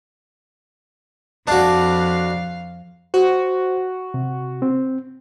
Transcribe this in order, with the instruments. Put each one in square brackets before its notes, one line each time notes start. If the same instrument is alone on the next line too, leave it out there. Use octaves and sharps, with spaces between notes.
[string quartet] F2 F5 [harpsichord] D4 F#4
[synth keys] F#4 [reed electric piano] C5
[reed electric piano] C3
C4